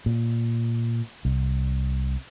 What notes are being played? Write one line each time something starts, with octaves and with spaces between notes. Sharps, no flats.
A#2
C2